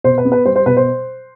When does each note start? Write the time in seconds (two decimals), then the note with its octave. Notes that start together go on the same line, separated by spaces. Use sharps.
0.04 B2 C5
0.18 B4
0.25 B3
0.32 B4
0.45 G3 C5
0.56 C5
0.66 B2 B4
0.77 C5